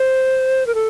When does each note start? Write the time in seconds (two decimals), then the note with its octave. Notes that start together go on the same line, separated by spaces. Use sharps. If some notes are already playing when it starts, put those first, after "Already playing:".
Already playing: C5
0.67 A#4
0.75 A4